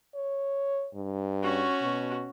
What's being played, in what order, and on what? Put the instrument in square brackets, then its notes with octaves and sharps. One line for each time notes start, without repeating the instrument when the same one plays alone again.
[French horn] C#5
G2
[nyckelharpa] C#4 F#4
[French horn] B2